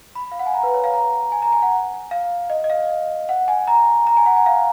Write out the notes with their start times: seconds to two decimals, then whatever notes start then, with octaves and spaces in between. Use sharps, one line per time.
0.15 B5
0.32 F5
0.39 F#5
0.46 G#5
0.54 A#5
0.63 B4
0.74 C#5
0.84 F5
0.94 A#5
1.32 G#5
1.42 A#5
1.52 G#5
1.62 F#5
2.11 F5
2.50 D#5
2.64 D#5
2.70 F5
3.29 F#5
3.48 G#5
3.67 A#5
4.07 A#5
4.17 G#5
4.26 F#5
4.36 G#5
4.46 F5